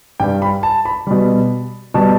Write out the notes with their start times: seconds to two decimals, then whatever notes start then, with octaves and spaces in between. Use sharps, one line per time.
0.20 G2 G3 G5
0.42 B5
0.63 A5
0.85 B5
1.07 B2 G3
1.94 B2 G3 A5